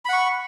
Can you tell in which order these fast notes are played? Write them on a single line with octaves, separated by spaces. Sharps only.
B5 F#5 C#6